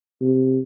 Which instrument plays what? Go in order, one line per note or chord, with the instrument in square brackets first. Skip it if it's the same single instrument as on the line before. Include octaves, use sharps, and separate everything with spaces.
[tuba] C3